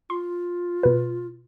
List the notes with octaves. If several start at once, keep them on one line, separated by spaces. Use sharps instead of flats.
F4 C6
B2 B4